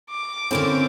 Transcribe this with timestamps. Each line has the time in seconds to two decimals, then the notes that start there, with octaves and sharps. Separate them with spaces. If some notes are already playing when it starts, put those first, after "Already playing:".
0.10 D6
0.51 D3 A#3 C4 C#4 E4 A4